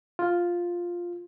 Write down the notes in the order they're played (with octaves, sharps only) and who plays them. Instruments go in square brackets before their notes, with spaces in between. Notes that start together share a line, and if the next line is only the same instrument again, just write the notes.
[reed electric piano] F4